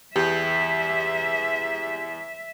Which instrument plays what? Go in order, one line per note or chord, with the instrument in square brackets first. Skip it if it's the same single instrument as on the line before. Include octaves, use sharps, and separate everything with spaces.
[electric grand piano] E2 [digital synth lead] G4 [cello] E5